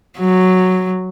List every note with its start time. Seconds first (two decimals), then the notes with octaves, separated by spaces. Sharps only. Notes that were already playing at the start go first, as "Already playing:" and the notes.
0.19 F#3